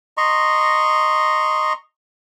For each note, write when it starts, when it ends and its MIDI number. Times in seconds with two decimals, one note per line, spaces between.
0.17 1.73 75
0.17 1.73 82
0.17 1.73 84
0.17 1.73 85